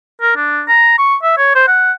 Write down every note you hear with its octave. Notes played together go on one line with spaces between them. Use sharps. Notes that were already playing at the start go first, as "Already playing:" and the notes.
A#4
D4
A#5
C#6
E5
C#5
C5
F#5